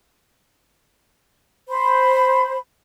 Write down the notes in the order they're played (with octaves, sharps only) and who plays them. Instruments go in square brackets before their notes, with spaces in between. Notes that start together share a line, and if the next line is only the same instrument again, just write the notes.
[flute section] C5 B5